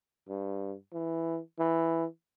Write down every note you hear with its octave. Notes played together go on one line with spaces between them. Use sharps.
G2
E3
E3